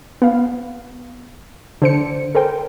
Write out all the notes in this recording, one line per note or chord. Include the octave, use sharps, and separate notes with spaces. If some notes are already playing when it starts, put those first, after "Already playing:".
B3 F5
D3 C5 C#7
A4 A#4 C5 G5